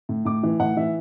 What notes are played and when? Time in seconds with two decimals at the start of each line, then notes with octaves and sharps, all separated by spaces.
0.09 A2
0.25 A2 D6
0.43 E3
0.60 A2 F#5
0.77 E3 E5